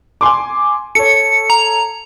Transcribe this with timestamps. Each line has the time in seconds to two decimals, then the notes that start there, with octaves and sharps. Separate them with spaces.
0.21 G#5 C6 D6
0.95 A4 C#5 C#7
1.50 A#5